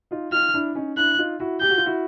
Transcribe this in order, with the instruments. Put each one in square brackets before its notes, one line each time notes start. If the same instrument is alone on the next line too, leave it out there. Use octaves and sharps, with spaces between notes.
[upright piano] D#4 F4
[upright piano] D#4 F4 [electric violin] F6
[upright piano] D4 E4
C#4 D#4
[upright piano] D4 E4 [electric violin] F#6
[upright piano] D#4 F4
E4 F#4
[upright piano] G4 [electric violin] G6
[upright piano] F#4
F4
E4 F#4